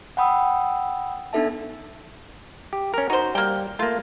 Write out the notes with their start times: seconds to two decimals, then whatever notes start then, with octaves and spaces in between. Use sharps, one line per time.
0.17 F#5 G5 B5 D#6 E6
1.33 B3 D4 D#4 A4 E5 A5
2.73 G4
2.94 C#4 A#4
3.10 D#4 F#4 C5
3.35 G3 A#3 G5
3.79 A3 A#3 F4